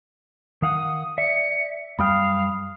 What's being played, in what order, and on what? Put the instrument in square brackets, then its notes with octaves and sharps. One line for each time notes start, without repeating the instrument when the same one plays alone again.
[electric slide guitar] D#3 F5 F#5 [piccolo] D#6
[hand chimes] D5 [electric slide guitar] E5 [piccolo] C#7
[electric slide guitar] F#2 G3 G5 [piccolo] F5 [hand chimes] B5 D#6 F6